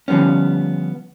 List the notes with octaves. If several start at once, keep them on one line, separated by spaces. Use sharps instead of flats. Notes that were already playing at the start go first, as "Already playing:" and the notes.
D3 F3 G3 B3 C#4